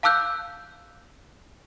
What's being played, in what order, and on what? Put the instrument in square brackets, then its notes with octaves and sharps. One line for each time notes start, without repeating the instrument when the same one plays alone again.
[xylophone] F5 A5 D6 E6 F#6 G6